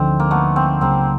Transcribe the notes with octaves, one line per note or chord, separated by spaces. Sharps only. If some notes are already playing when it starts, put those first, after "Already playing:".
Already playing: D2 D3 F3 C4 D#4
A#3
A3 B3
A#3 C4
C#2 C#3 F#3 A#3 C4